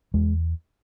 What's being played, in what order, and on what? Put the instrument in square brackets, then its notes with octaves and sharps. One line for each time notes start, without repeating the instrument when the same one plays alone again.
[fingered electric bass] E2 G#3